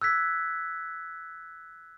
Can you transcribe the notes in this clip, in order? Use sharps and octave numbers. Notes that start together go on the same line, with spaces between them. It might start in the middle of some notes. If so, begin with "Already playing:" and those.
E6 F#6 G#6 B6